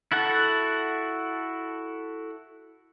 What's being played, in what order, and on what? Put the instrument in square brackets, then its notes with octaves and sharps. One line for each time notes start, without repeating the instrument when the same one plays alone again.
[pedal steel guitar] E4 F#4 A4 F#5